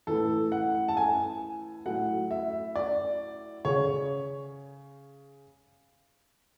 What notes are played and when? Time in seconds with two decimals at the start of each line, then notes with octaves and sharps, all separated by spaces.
0.07 A2 E3 A4
0.52 F#5
0.88 A5
0.97 G#5
1.86 A2 F#3 F#5
2.31 E5
2.76 D5
3.65 C#3 C#5